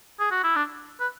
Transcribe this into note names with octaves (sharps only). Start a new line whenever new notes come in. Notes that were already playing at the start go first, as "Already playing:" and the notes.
G#4
F#4
E4
D4
B4